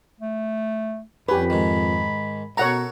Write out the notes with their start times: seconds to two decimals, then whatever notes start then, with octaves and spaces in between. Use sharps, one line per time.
0.20 A3
1.29 F2 C#4 G4 B4 B5
1.50 G#2 D#3
2.57 B2 F#4 A4 A#4 C#5 F#5 A#5